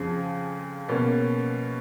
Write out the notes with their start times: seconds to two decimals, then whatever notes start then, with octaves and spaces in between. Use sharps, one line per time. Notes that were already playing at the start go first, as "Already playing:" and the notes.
Already playing: F2 C#3 F3 G#4
0.88 B2 A#3 C#4